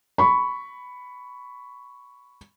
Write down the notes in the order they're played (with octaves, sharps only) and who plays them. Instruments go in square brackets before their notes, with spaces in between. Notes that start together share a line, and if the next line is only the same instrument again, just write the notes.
[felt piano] B5 C#6